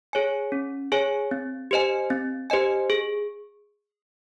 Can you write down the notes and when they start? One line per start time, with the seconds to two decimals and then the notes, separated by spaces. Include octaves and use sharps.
0.13 G#4 C#5 G#5
0.52 C#4
0.92 G#4 C#5 G#5
1.31 C4
1.71 G4 C5 D#5 G#5
2.10 C4
2.50 G4 C5 D#5 G#5
2.90 G#4